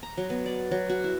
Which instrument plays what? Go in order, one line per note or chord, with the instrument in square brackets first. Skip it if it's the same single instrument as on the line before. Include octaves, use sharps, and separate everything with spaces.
[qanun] A#5
F#3
B3
D5
F#3
F#4
E4